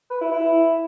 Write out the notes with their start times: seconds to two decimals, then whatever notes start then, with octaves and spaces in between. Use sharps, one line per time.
0.10 B4
0.21 E4
0.32 E4